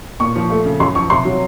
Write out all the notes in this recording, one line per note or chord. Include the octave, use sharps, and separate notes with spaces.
A#2 C#6
F3
A3
C#3
F#2 C6
F3 C#6
C3 C6
F#3